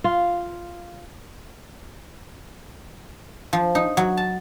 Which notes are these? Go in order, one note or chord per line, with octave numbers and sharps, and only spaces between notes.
F4
F3
D#4
F#3
A5